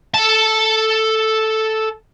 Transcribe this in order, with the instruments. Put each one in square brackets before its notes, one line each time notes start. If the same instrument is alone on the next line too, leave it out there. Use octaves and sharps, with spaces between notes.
[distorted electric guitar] A4 A5